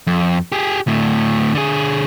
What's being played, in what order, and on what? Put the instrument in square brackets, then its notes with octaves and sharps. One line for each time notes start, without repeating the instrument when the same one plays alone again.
[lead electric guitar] F2
G4 G#4
D2 A2
D3 G#4